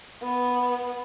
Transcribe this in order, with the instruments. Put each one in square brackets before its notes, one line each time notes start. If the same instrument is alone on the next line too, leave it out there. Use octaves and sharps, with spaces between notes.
[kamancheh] B3